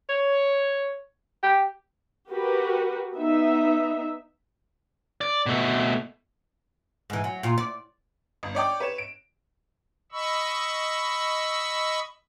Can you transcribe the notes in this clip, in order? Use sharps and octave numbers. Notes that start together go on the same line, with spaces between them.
C#5
G4
F#4 G4 A#4 B4
B3 D#4 E5
D5
B2 A3
G#2 E3
F#3
A#2 F4
D5
G1
C#5 D5 G5 D6
B4 C#5 E7
D7
D#5 B5 C#6 E6